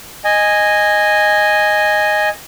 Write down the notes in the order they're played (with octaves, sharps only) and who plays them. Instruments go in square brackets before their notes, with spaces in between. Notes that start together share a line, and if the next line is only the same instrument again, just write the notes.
[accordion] D#5 G#5